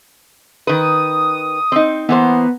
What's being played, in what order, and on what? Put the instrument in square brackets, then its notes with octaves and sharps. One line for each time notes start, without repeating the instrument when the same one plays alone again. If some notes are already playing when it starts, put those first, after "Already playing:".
[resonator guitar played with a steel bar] D#3 B4 [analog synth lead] D#6
[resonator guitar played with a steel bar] C4 D#4
[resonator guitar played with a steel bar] E3 A#3 C5 [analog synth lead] B3